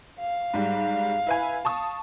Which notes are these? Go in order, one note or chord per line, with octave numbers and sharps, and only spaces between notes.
F5
G#2 G3
E4 B4 G#5
A5 C#6 D#6